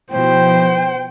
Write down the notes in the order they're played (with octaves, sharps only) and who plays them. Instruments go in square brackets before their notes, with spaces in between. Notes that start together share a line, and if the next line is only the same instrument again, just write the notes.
[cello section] B2 F3 E4 [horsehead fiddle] C5 G5